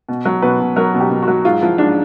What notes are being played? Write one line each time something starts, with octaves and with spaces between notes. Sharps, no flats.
B2
F#3
B2 B4
B2
F#3 A#4
B2
G4
B2
F#4
F#3
G#2 F4
F3 E4
G#2 D4